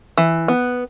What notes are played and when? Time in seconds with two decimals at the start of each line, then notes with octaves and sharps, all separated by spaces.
0.17 E3
0.48 B3